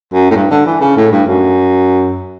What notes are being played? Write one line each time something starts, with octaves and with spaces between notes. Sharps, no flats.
F#2
A2
G2
D3
E3
C#3
A2
G2
F#2